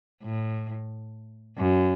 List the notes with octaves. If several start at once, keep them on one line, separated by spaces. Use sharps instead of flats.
A2
F#2